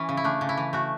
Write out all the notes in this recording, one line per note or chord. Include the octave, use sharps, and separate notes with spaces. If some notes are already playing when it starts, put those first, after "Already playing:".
Already playing: E3 C#4
C#3
E4
A3 D4
C#3
E4
E3
A3 F#4